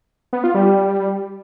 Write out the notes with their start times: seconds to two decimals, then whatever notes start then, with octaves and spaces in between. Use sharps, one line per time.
0.33 B3
0.44 F4
0.55 G3